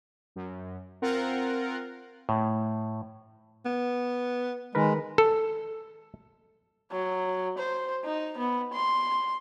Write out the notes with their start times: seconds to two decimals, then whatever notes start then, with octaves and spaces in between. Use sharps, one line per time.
0.36 F#2
1.02 C4 F4 A#4 F#5
2.29 A2
3.65 B3
4.75 D#3 G#3 A#4 B4
5.18 A4
6.91 F#3
7.58 C5
8.04 D#4
8.38 B3
8.73 C6